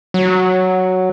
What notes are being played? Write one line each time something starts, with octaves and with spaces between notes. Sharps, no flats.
F#3